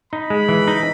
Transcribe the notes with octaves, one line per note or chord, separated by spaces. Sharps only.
D#4 B5
G#3
E3
D#4